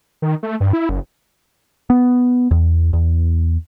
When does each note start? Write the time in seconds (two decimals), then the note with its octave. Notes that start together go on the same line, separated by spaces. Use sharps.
0.22 D#3
0.43 A3
0.60 G2
0.73 E4
0.89 F#1
1.90 B3
2.51 E2
2.93 E2